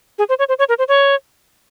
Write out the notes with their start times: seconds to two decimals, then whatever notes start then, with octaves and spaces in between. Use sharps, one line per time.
0.19 G#4
0.29 C5
0.39 C#5
0.49 C5
0.59 C#5
0.69 A#4
0.79 C5
0.88 C#5